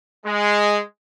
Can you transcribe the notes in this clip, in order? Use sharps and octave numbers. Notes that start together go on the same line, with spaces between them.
G#3